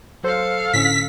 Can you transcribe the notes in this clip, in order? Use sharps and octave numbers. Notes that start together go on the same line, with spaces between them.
F#3 A4 C5 F5
A2 D3 C#4 B6